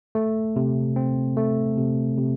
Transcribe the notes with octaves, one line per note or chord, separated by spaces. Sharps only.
A3
C3
C4
A3
C3
C3